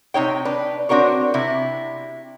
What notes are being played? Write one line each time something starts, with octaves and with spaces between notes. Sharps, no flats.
C3 D#4 C#5 G5
D4 B4
C4 D4 F#4 A#4 C#5
C3 E4